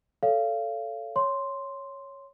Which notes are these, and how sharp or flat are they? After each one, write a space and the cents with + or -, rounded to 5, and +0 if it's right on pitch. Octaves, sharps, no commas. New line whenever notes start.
A4 +0 C#5 +30 F5 -25
C#5 +0 C6 +0